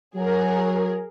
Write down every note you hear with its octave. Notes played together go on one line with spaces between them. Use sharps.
F#3 G#4 A#4